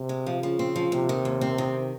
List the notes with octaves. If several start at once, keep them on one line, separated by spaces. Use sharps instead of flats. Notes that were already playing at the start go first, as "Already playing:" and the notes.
Already playing: C3
G#3
F3
C#3 F3
C4
F3
D#2 C3
D#3
D#2
C4
D#3